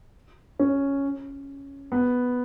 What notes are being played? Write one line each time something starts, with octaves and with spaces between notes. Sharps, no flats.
C#4
B3